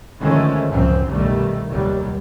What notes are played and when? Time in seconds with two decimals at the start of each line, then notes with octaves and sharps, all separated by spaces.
0.19 D3 D#3 F3 G#3 A3 C#4
0.69 C#2 F#2 A2 F3 C4
1.09 C2 B2 D#3 G3 A3
1.69 F1 D#2 F#3 G3